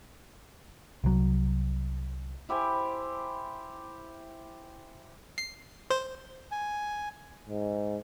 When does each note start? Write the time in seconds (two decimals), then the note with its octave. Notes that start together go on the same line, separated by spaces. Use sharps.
1.04 C2 F#3
2.49 E4 G4 C5 G#5
5.38 C7
5.90 C5
6.51 G#5
7.49 G#2